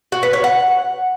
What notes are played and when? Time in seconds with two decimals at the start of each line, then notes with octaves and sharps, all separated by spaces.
0.12 F#4
0.23 B4
0.33 C#5
0.44 F#5